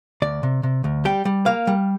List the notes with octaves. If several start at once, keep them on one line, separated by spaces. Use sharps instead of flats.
D2 D5
C3
C3
D2
G3 G5
G3
A#3 F5
G3